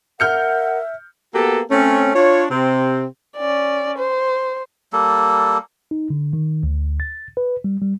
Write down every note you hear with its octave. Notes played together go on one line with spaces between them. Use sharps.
A#4 E5 F#5 F6 G6 C#7
A#3 B3 F#4 G4 A4
A3 C4 C#4
D4 F4 C#5
C3 C4
C#4 D5
C5
G3 A#3 A4
D#4
D3
D#3
D2
A6
B4
G3
G3